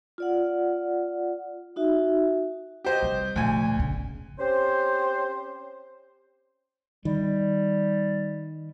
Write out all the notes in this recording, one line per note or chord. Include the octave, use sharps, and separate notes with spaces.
F4 D5 F#5
D#4 F#4 E5
G4 C5 D#5
C3 G3
D2 A#2 F3 G#5
G1 C#3
C4 C#4 G4 C5
D#3 G3